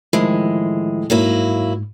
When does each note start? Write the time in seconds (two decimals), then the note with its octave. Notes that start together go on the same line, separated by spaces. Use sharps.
0.13 A2 D#3 F3 G#3 E4
1.10 G#2 F#3 A#3 E4